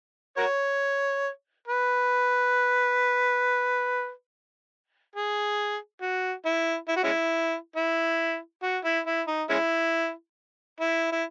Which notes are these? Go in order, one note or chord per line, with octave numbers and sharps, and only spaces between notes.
F#4 A#4 C#5
B4
G#4
F#4
E4
E4
F#4
G#3 C#4 E4
E4
F#4
E4
E4
D#4
G#3 C#4 E4
E4
E4